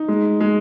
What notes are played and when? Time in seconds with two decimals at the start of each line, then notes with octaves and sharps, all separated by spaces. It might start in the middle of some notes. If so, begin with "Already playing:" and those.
Already playing: D#4
0.08 G#3
0.41 G#3